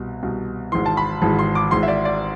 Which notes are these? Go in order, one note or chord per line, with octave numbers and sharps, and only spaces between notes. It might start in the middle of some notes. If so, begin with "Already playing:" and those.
Already playing: C2 B2
C2 B2
G#1 G#2 E3 C6
A5
B5
G#1 G#2 E3 A5
C6
D6
G#1 G#2 E3 C6
E5
D5
D5